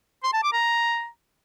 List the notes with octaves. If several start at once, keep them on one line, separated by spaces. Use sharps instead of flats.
C6
A5
D6
A#5